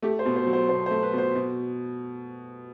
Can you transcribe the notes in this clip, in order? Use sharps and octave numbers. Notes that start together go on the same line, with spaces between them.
A3 G4
C5
B2
C5
F#3
C5
B2 C5
C5
A3
B4
B2 C5
B2